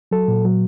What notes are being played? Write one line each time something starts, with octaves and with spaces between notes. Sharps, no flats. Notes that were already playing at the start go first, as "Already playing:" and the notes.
F#3 A4
A#2
F#3